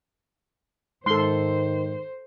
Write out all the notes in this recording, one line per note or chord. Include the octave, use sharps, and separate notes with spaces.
G#2 D#3 A4 C5 C6